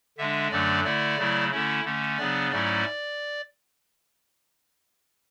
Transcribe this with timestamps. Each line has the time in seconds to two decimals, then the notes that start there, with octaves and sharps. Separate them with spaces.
0.18 D3 G#3 D4 E5
0.51 F#2 D3 F#3 A3 D4 D5
0.84 D3 A3 E4 D5
1.18 C#3 F#3 A3 E4
1.51 D3 A3 C#4 E4
1.84 D3 A3 C#4
2.18 C#3 F#3 B3 D4 D5
2.51 G#2 F#3 A3 C#4 E4 D5